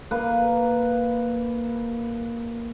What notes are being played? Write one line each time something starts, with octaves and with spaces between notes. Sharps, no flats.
A#3 B4